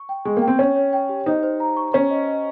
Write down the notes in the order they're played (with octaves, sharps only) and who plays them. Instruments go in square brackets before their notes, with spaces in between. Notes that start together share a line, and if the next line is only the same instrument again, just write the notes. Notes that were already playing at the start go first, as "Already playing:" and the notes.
Already playing: [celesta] C#6
G5
[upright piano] G#3 [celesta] C#6
[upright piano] A#3
[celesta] G5
[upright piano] C4
[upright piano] C#4 [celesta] C#5
[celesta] C#5
G5
G4
[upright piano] D#4 [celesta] C5
[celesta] C5
A#5
C#6
[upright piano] C#4 [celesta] C#6
[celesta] D#5
D#5